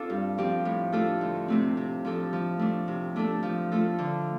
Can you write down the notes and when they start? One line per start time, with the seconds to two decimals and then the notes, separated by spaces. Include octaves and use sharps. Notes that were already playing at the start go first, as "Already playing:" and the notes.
Already playing: C4 D4 F4 A4
0.10 G2
0.38 F3 C4 G4
0.65 A2
0.92 A3 D4 F4 A4
1.21 D2
1.48 C3 A3 C4
1.77 C3
2.05 F3 D4 A4
2.33 F3
2.59 A3 D4
2.88 C3
3.16 A3 D4 A4
3.43 F3
3.72 A3 F4 A4
3.98 D3